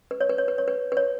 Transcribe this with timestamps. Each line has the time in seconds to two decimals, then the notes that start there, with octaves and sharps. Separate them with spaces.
0.11 B4
0.21 C#5
0.29 B4
0.38 C#5
0.48 B4
0.58 C#5
0.68 B4
0.92 B4
0.97 C#5